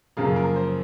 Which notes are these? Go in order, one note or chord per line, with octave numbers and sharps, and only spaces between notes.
F#2 C#3 F3 A#3 F4 G#4
A#4
C5